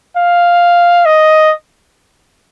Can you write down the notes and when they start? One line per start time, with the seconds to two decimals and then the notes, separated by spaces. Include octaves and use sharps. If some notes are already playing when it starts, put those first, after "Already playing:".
0.17 F5
1.05 D#5